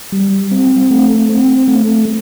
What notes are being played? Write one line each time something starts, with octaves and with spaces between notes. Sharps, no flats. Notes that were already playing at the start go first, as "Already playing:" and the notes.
G3
C4
A3
C4
A3